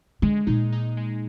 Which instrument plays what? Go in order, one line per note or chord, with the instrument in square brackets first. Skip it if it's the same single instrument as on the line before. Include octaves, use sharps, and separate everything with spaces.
[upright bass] D3 [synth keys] G#3
[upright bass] A#2 [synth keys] D#4
[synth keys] D#4
G#3